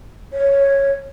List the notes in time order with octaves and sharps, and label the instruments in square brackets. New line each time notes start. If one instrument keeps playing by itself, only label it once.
[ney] C#5